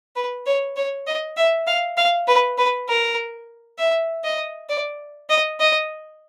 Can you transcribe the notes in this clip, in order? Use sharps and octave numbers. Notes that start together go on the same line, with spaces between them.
B4
C#5
C#5
D#5
E5
F5
F5
B4
B4
A#4
E5
D#5
D5
D#5
D#5